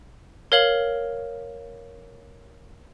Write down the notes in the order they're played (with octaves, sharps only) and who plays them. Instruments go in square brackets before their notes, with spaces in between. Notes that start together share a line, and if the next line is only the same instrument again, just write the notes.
[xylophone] A#4 C#5 F5 F#7